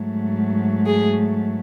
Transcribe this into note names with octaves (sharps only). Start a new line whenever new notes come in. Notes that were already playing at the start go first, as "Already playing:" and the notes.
Already playing: G#2 F#3 A3
G#4